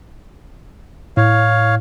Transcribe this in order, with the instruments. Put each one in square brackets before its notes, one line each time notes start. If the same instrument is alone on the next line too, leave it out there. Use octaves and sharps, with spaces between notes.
[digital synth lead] A2 [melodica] C#5 F5